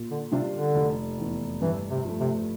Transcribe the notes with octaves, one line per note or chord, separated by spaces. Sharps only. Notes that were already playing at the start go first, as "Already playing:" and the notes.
Already playing: A#2
D3
C3 G3 D4 F4
D3
F1
E2 E3
G2 E3
C3
F3 A3
C3